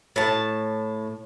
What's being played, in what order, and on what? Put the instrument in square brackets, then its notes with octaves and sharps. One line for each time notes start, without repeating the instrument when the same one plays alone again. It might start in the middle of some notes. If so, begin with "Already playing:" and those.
[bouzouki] A2 A5